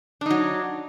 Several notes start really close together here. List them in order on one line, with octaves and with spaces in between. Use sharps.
D4 D#4 F#3